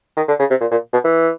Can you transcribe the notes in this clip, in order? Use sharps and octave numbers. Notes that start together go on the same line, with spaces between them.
D#3
D3
C#3
C3
A#2
A#2
B2
E3